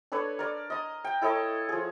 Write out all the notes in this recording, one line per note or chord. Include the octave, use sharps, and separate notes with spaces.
D4 A4 B4 C#5
A#4 D5
D#5 D#6
G5
E4 A4 C#5 D#5
F3 G#4